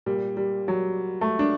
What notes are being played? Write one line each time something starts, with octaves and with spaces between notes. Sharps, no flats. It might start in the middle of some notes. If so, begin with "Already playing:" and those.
A#2 G3
G3
F#3
A3
D4